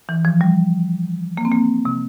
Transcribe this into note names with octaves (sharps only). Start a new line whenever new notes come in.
E3
F3
G3
A#3
C4
A#3
C3